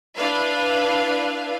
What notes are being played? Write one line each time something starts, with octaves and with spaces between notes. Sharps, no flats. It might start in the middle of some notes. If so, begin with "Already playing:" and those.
D4 E4 B4 F5